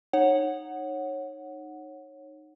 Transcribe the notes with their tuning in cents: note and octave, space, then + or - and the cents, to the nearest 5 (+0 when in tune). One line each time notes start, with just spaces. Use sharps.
D#4 -15 C#5 -15 F#5 -5